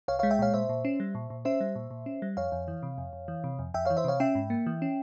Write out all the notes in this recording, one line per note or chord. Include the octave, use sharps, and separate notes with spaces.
C2 C#5 F5
G#3 C#5 F5
E5 G5
A#2 C#5 F5
A#2 C5 E5
A#2
C#4
G3
A#2
A#2
C#4 C5 E5
G3
A#2
A#2
C#4
G3
F2 C#5 F5
F2
E3
C3
F2
F2
E3
C3
F2
F2 E5 G5
E3 C#5 F5
C5 E5
C3 C#5 F5
C#4 E5 G5
G#2
A#3
E3
C#4